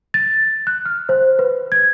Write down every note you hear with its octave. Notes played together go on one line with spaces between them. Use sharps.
A6
F#6
F6
C5
B4
G#6